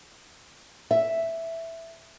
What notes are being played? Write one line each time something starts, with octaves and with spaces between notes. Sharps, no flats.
E5